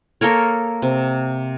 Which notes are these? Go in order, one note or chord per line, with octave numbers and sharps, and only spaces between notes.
A#3 A4 A#4 C#5
C3